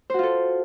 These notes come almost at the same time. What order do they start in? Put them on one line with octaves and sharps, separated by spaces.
C5 F#4 F4 A4